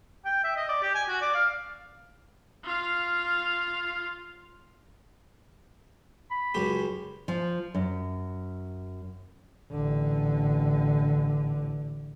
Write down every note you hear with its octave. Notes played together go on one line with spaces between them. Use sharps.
G5
E5
D#5
D5
G4
G#5
F#4
D5
F5
F4 F5
B5
C#2 F#2 G4
F3
F#2
A1 D3